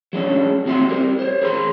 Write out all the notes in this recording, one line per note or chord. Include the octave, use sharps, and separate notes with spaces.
F#3 G#3 C#4 D4
D#2 C4 F#4 G4 E5 C6
G3 A#4 C5
C5 C#5
G#4 A#4 C5 C6